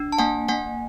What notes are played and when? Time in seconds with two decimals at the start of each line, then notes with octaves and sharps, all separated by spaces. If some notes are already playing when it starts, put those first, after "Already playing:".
Already playing: D4
0.12 A5
0.18 A#3 F#5 G#5
0.48 A#3 F#5 G#5